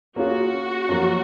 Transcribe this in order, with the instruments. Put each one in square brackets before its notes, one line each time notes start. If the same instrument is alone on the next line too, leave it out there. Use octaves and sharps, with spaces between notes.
[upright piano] A#3 C#4 F4 G#4 [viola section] F#4
[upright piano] F#2 F3 A#3